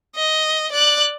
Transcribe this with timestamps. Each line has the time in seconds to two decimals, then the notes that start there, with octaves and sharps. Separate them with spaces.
0.16 D#5
0.72 D5 F#6